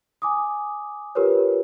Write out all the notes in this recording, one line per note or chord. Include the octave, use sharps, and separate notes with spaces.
G#5 D6 D#6
F4 G4 A#4 B4 C#5